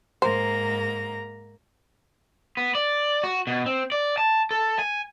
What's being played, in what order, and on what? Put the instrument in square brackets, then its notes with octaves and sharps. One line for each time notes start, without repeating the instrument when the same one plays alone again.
[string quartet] G#2 A#3 A#5 [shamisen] C5
[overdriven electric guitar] B3
D5
F#4
B2
C4
D5
A5
A4
G#5